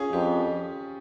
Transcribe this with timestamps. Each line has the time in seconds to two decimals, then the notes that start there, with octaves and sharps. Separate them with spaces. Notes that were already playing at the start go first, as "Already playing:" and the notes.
Already playing: C#4 F4 G#4
0.13 F2 G4